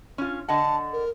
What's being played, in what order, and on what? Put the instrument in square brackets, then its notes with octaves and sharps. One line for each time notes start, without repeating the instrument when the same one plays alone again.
[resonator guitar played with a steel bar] C#4 F4
[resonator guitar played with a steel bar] D3 D#5 F#5 [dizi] A5
[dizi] A#4